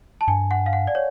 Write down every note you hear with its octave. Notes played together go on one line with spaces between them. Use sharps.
A5
G2 G#5
F#5
F5
F#5
D5
C#5